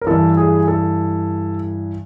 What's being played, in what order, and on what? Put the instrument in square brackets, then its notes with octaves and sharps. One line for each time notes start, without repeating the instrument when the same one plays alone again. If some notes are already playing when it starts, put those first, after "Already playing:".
[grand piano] A#4
G2 E3 A4
G#4
A4